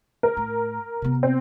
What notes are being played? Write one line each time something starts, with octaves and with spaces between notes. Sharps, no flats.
A#4
A2
C3 B3
C4